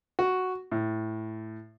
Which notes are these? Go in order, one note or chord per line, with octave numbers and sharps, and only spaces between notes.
F#4
A2